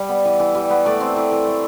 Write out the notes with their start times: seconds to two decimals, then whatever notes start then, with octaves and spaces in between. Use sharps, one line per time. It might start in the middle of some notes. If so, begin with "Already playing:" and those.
Already playing: G3
0.09 B3
0.25 E3
0.40 E3
0.55 G3
0.70 B3
0.85 A3 D5
1.00 C4
1.16 E3
1.31 E3
1.47 A3